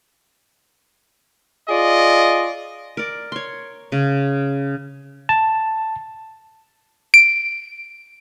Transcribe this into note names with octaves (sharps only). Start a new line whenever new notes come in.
F4 G#4 D5 D#5
A#4 D5
C#5 C6
C#3
A5
D7